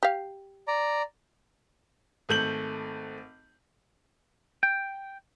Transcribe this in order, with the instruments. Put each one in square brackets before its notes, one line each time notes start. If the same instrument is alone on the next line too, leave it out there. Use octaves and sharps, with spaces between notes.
[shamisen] G4 F5
[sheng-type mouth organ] D5 A#5
[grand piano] G#1 A3 G6 F#7
[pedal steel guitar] G5